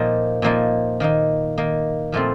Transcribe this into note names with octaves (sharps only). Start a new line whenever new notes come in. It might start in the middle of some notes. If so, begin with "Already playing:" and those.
Already playing: A#2 F3 A#3 D#4
A#2 F3 A#3 D#4
D#3 A#3 D#4
D#3 A#3 D#4
A#2 F3 A3 C4 F4